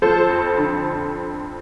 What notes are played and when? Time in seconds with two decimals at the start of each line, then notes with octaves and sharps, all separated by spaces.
0.02 F3 A4 C5
0.29 F2
0.58 D3